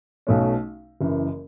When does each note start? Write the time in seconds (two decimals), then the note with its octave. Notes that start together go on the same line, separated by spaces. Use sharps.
0.27 B1 B2 A3 C#4
1.01 F#1 F#2 E3